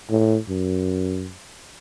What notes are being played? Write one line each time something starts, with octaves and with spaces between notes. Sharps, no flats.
A2
F#2